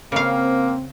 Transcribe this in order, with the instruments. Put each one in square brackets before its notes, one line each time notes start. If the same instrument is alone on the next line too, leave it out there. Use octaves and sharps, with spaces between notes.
[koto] C#3 F5 [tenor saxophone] A#3 [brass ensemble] C4